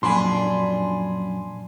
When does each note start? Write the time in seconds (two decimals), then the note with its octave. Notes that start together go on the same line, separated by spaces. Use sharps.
0.03 F#2 A#2 F3 D4 G#5 B5 C6